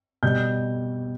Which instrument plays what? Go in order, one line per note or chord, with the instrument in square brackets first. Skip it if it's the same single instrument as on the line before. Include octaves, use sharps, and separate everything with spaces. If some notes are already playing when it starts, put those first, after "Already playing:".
[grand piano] B2 G3 G6